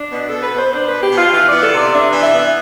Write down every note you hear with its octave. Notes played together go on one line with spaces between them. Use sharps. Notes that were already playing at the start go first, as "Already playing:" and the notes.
Already playing: D4
B2
B2 A4
B4
B3
C5
D4 C5
B2 B4
G4
B2 F4
E3 F4
B3 D5
A4
C3 D5
D4 E5
E3
E5
B3
E5